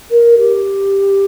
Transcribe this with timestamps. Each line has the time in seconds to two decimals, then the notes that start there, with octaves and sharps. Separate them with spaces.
0.10 A#4
0.38 G4